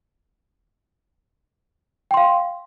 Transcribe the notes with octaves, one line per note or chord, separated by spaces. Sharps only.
F5 G5 C6